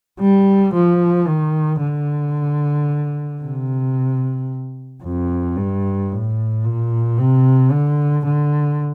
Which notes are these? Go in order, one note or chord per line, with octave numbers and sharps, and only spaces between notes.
G3
F3
D#3
D3
C3
F2
G2
A2
A#2
C3
D3
D3